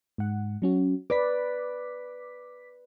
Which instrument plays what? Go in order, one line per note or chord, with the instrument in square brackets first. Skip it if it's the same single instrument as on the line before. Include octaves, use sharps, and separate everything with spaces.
[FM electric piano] G#2 F#5
F#3 C#4 F#4
[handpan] B4 D5 [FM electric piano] D6 B6